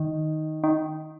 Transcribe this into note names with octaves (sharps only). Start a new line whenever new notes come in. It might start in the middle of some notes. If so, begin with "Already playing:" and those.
Already playing: D#3
D#3